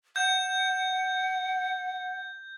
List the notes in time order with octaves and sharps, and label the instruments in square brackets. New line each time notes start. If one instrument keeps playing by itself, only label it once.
[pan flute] F#5 [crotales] G6